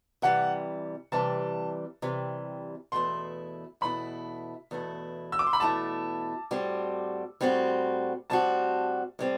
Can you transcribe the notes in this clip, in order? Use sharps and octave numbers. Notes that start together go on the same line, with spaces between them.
C3 E3 G3 F#5
C3 E3 G3 A5
C3 E3 G3
E2 B2 A3 E4 C6
E2 B2 A3 E4 B5
E2 B2 A3 E4
E6
D6
C6
B5
E2 B2 A3 E4 A5
A2 G3 C4 F#4
A2 G3 C4 F#4
A2 G3 C4 F#4 A5
A2 G3 C4